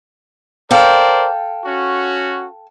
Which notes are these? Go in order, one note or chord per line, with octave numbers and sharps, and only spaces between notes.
A4 A#4 C5 D5 F5 G5
C#4 F#4